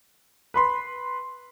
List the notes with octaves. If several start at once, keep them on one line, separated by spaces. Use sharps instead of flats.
B4 B5 C6